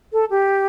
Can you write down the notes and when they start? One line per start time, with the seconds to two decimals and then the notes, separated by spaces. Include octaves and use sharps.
0.13 A4
0.30 G4